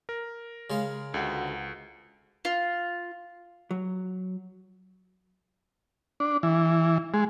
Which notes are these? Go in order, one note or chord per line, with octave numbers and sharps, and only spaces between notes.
A#4
C#3 G#3 F5
C#2 D3 F#4
F4
F#3
D4
E3
G#3